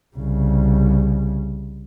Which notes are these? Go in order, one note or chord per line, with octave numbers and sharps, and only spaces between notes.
C2 C#3